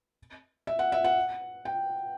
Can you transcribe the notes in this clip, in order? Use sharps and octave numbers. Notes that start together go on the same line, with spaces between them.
E5
F#5
E5
F#5
G5